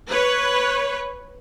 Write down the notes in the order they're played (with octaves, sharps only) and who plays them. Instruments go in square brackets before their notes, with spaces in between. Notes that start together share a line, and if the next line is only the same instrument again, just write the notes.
[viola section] B4 C#5